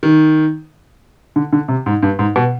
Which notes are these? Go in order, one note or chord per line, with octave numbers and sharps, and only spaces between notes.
D#3
D3
D3
C3
G#2
G2
G#2
B2